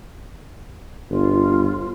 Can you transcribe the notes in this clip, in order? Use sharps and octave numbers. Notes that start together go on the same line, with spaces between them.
G1 F4